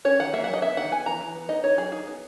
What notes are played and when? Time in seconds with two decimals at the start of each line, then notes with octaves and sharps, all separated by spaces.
0.05 C#4 C#5
0.19 D#3 F#5
0.33 A#3 E5
0.44 F#3 F#5
0.54 D#5
0.62 B3 E5
0.77 D#3 F#5
0.91 B3 G#5
1.06 E3 A#5
1.21 E3
1.35 B3
1.49 D#4 D#5
1.64 D#4 C#5
1.78 F#3 G#4
1.92 D#4 G#4
2.07 B3